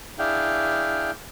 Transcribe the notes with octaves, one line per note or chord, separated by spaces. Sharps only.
D4 E4 G#4 F5 G5